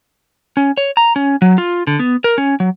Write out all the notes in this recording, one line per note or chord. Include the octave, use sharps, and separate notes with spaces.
C#4
C#5
A#5
C#4
F#3
F4
D3
B3
A#4
C#4
F#3